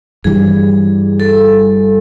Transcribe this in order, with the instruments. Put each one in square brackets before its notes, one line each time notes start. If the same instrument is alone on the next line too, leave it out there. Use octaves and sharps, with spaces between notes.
[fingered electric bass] G2 E3 G3 [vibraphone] G#4
[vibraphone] A4